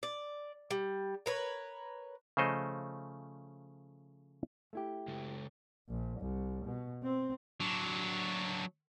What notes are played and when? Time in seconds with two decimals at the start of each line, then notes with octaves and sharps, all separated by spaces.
0.03 D5
0.71 G3
1.26 A#4 B4 C#5
2.37 C#3 F3 A3 C5 C#5 D#5
4.73 A3 E4 G4
5.08 C#3 G#3 A4
5.89 A#1
6.20 C2
6.65 B2
7.03 C4
7.60 F#3 D4